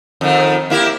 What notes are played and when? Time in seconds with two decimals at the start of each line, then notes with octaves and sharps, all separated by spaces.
0.21 F2 D#3
0.70 A#3 E4 G4